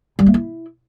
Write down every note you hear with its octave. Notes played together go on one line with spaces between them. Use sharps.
G3
A#3
E4